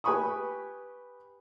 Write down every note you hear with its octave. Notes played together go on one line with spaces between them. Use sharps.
G4 B4 G#5 B5 C#6 D#6